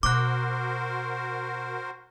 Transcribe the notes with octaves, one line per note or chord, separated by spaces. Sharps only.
B2 F#4 A#4 C5 D6 F#6